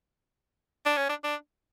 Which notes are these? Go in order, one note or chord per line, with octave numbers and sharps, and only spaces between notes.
D4
C#4
D4
D4